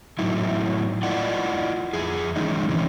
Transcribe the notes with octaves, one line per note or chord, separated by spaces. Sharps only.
A2 F#3 D#4 E4
E4 F4 D5 D#5 F#5
F2 G#4
D#3 E3 G#3 C#4 D#4
C3 E3 C#4